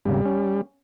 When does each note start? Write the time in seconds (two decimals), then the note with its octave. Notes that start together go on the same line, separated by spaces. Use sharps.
0.05 G#1 D#2 C#3 G3
0.25 C#4